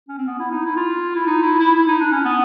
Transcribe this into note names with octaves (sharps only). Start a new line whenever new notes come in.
C#4
C4
B3
E4
D#4
E4
F4
E4
D#4
E4
E4
E4
D#4
D4
C#4
B3